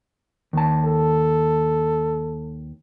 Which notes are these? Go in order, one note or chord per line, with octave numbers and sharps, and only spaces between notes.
D#2 A5
A4